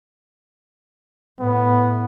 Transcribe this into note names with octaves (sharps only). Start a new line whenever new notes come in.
A2 B3